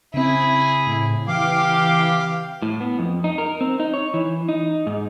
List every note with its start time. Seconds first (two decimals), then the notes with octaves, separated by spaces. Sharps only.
0.14 C#3 C4 E4 G#4
0.87 A2
1.28 E3 G4 F5 D6
2.62 A2
2.80 B3
2.99 F2
3.24 D#4
3.38 A#4
3.61 C4
3.80 D#4
3.94 C#5
4.14 E3
4.49 D#4
4.87 G#2